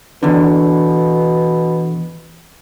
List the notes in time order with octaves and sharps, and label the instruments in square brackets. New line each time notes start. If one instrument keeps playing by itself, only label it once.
[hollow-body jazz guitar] E2 D3 [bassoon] B2